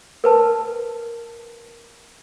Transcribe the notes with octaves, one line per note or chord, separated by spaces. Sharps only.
A#4 B4 A5